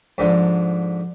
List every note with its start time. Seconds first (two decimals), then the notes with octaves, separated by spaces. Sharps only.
0.18 G#2 D3 F3